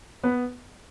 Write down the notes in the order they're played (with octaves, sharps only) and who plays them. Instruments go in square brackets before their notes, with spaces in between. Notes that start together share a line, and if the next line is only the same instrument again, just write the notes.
[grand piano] B3 B4